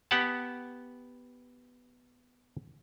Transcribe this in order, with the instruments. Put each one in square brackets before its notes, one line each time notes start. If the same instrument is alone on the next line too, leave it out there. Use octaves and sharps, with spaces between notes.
[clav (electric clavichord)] B3 G4 F#5 A5